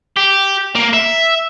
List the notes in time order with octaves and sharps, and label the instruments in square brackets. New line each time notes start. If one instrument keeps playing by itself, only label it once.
[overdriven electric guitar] G4
A#3
E5